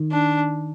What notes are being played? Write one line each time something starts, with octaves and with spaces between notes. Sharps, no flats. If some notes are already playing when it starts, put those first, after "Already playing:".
Already playing: D#3
D4